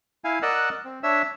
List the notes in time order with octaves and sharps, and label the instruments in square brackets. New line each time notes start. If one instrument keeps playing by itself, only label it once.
[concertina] E4 F5 G#5
A#4 D5 D#5 F#5 E6 F#6
C4
D4 C#5 E5 E6